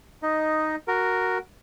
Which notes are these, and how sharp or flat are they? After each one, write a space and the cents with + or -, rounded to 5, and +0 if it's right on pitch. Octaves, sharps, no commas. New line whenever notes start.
D#4 +0 D#5 +0
F#4 +0 A#4 +0